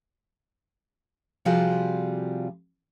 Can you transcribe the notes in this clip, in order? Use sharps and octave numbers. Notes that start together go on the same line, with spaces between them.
C3 F3 G3 F4 F#4 G#4